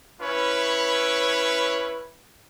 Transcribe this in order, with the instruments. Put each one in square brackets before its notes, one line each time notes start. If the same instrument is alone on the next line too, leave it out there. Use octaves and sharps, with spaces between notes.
[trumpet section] C#4 E4 B4 C#5